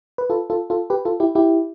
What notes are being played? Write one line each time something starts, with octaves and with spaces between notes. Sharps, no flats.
B4
F4 A4
F4 A4
F4 A4
G4 B4
F4 A4
E4 G4
E4 G4